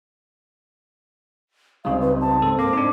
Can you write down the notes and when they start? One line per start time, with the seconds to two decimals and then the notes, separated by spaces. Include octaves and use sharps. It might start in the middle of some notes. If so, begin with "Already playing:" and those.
1.85 C#2 C#3 G3 C4 D#4 F5
2.01 B4
2.21 A5
2.42 G#2 C4 A4
2.59 A#3 D6
2.73 D4 D#4